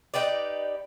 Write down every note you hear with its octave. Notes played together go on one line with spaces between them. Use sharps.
D#4 G4 B4 D5